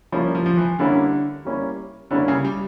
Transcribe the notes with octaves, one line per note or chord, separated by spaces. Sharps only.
F3 G3 A#3 C#4 E4
F3
F3
E3
D3 G3 A#3 C#4 E4
G3 A#3 C#4 E4
D3 G3 A#3 C#4 E4
C#3
G3